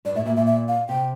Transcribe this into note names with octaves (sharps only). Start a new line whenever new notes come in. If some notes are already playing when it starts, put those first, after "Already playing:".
G2 D5
A2 E5
A#2 E5
A#2 E5
E5
F5
C3 G5